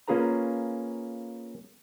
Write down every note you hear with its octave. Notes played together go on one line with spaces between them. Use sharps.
A#3 C#4 F4 G#4 B4 A#5